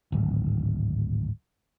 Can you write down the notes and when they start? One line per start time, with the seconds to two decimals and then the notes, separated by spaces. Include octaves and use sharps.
0.12 D1 G#1